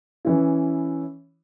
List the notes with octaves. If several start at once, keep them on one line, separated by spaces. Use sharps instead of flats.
E3 C#4 E4